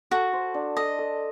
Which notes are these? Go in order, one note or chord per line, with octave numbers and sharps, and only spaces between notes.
F#4 A4
C5
D4
A4 D#5
A4